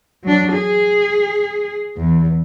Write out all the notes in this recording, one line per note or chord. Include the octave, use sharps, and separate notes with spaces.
F#3 D4
G#4
E2